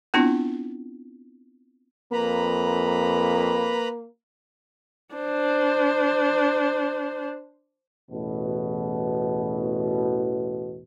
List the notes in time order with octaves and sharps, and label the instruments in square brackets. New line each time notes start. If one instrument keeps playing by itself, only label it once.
[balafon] B3 C4 D4 E4 F4
[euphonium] F2 [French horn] A#3 [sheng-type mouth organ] B4 A#5 B5
[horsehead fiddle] D4 C5
[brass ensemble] A1 E2 B2